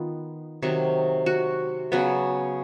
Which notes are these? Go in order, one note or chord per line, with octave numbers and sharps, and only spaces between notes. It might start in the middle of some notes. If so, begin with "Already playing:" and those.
Already playing: D#3 B3 F4
C3 D#3 F#3
F#4
C#3 F#3 B3